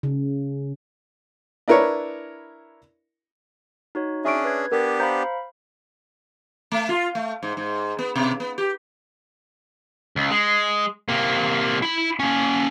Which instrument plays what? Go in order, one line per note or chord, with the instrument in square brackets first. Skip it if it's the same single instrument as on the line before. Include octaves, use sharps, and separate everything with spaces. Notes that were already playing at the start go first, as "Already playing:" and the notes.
[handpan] C#3
[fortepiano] D4 E4 A#4 B4 C#5
[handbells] D#4 F#4 C#5
[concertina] C#4 D4 G#4 [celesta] E5 C#6 D7
[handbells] B4 G#6
[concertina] B3 D4 G4 [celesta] A#4
[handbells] C5 F5 B5 [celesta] A#5 G6
[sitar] A3
F4
A3
G#2
G#2
B3
B2
B3
G4
[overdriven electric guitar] C#2
G#3
C3 A#3
E4 B5
A#3 C#4